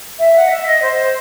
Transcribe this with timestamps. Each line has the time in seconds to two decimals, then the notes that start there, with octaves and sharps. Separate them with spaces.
0.19 E5
0.34 F#5
0.45 D#5
0.50 E5
0.66 D#5
0.82 C5